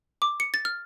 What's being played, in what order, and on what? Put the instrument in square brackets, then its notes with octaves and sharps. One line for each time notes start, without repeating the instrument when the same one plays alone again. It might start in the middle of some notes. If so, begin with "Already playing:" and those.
[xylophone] D6
C#7
A6
F6